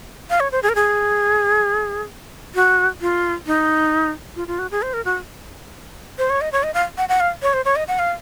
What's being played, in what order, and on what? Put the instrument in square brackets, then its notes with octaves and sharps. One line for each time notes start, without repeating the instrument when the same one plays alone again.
[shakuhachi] F5
C#5
C5
G#4
A#4
G#4
F#4
F4
D#4
F4
F4
F#4
G#4
C5
A#4
F#4
C5
C#5
D#5
C#5
D#5
F5
F#5
F#5
F5
C#5
C5
C#5
D#5
F#5
F5